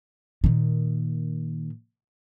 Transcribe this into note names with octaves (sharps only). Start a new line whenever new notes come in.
A#2 D#3